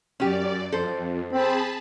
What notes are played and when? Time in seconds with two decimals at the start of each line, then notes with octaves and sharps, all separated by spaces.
0.20 F#2 C#4 G4 D5
0.72 F2 A4 C5
1.31 C4 G#4 A5 B5